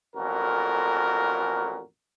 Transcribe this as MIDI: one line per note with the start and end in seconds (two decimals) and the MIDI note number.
0.16 1.83 33
0.16 1.83 41
0.16 1.83 46
0.16 1.83 66
0.16 1.83 70